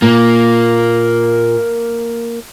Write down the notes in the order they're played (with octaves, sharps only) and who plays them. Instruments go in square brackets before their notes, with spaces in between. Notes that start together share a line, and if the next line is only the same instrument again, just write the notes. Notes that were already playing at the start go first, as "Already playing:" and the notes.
[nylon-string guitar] A#2 [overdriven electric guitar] A#3